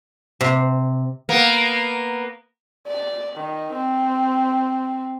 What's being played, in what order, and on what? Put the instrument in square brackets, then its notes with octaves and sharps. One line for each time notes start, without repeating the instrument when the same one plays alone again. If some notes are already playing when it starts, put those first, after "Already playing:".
[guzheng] C3
[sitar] A#3 B3
[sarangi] D5
D#3
C4